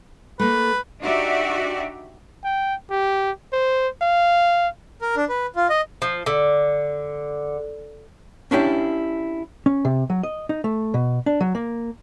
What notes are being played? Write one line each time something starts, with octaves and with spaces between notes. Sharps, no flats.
A3 A#3 B4
D4 D#4 F#4 G4 D5 E5
G5
G4
C5
F5
A#4
D4
B4
F4
D#5
F3
D3
C#4 D4 E4 G4
C#4
C3
F#3
D#5
D#4
A3
B2
D4
F#3
A#3